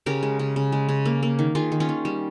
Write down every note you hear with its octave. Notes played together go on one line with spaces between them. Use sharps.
C#3 G4 A#4
G#3
C#3
C#3
G#3
C#3
A#3
A#3
D#3
D#3 F4 G#4
D#3
C#4 F4
D#3
G3